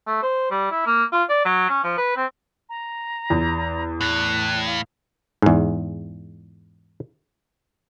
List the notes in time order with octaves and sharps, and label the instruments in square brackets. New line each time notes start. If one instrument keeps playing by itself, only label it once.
[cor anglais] A3
C5
G3
E4
A#3
F4
D5
F#3
C#4
F3
B4
C4
[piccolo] A#5
[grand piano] E2
[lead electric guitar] A2 [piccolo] F#6
[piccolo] F5
[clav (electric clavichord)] E2 G#2